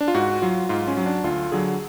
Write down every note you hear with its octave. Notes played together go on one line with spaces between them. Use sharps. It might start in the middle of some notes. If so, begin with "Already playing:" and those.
D4
F4
G#2 F#4
F#3 F4
G#2 F4
C#4
F#3
D4
D2 F4
D3 F#3 G#4